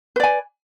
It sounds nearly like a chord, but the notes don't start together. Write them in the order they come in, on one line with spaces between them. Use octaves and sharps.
B4 D5 G#5